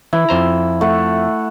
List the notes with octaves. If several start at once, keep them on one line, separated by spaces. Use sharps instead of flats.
E3 E4
F2 C5 A#5
A3 F#5